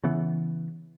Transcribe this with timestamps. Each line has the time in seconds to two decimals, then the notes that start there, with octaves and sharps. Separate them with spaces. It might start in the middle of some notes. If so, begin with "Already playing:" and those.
0.04 C#3 E3 B3